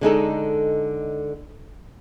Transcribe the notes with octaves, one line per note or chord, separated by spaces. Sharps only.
D3 G#3 D#4 A4